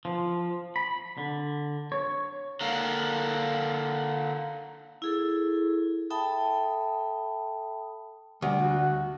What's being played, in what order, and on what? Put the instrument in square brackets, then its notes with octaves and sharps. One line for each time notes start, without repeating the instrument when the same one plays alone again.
[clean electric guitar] F3
B5
D3
C#5
[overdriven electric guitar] D3 A#3
[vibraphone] E4 G#4 A4
A4 E5 G5 A5 B5 D#6
[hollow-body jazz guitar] D2 [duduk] G3
[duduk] F#4